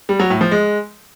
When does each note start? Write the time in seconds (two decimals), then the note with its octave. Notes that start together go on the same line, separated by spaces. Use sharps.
0.09 G3
0.20 F#3
0.30 A2
0.41 F3
0.51 G#3